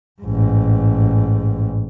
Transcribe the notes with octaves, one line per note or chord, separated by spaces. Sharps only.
A1 G#2